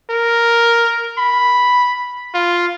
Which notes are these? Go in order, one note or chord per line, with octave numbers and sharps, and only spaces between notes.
A#4
B5
F4